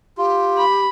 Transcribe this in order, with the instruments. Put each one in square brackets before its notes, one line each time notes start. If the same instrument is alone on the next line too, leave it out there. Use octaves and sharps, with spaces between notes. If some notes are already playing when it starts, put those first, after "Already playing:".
[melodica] F4 [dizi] G4
[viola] B5